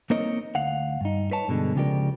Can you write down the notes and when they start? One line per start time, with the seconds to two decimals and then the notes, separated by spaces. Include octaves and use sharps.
0.10 A#3 C4 D#4 A#4 C#5 D#5
0.55 D2 F5 F#5
1.01 G2 D#4
1.31 B4 C#5 A5
1.48 G2 B2 D3 G#3
1.75 C#2 C#3 F3 G4 A#4 D5